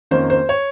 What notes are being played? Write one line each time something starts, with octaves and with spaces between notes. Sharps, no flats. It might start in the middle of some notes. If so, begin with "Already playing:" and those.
F2 D#3 A#3 C#4 C5
C5
C#5